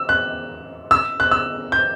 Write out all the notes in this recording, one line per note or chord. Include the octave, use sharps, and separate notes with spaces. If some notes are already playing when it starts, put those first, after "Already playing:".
Already playing: E6
F#6
E6
F#6
E6
G6